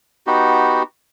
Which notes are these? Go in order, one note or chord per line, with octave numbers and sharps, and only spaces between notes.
B3 D#4 F#4 G4